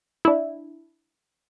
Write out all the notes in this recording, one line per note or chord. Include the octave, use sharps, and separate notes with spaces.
D4 E4